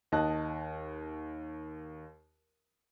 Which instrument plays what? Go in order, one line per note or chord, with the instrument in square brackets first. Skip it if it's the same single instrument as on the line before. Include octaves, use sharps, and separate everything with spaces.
[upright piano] D#2 D#5 A5 F#6